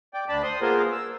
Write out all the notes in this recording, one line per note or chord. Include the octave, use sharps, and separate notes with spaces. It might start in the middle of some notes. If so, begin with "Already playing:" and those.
D5 G5
D2 D4 A5 B5
C5 C6 D#6
A#3 B3 F4 G#4 A#4 C5
E6